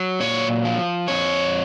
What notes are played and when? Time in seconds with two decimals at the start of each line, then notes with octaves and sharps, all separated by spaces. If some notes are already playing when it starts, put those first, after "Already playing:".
Already playing: F#3
0.20 A#2 C#5
0.65 F3
1.08 F2 C#5